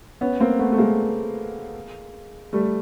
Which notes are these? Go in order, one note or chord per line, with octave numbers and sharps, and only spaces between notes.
B3 C#4
A#3 C4
A3 B3
A3
G#3 A#3
G3 A3